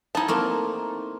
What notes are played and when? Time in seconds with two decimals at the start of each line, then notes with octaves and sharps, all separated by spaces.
0.15 B3 D#4 E4 A5
0.28 A3 A#3 C4